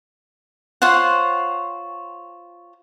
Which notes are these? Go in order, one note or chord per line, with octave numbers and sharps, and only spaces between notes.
F4 C5 C#5 F#5